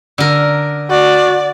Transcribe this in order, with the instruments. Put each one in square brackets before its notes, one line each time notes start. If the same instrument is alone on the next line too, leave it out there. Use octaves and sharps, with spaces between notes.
[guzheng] D3 A#4
[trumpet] F#4 [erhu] D5